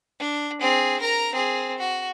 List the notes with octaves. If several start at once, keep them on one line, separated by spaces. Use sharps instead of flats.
D4
C4 G#4
A#4 A#5
C4 G#4
F#4